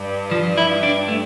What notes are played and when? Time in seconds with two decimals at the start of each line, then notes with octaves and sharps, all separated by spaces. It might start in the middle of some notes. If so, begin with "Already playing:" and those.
Already playing: G2
0.31 F3
0.58 E4
0.83 D4
1.08 A3